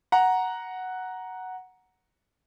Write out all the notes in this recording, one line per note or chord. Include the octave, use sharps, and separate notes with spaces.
F#5 A#5